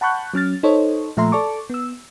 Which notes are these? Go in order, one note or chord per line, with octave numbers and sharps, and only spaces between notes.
F#5 A5 B5 C#6 F#6 G6
F#3 C#4 F6 A6
D#4 A4 C5 C#5 D#5
A#2 F3 A3 E5 A#5 C6
A4 D5 A5 C#6 D6
B3 E6